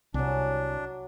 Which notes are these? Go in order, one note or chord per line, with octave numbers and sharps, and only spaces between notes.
C2 C3 F#3 D4 G#5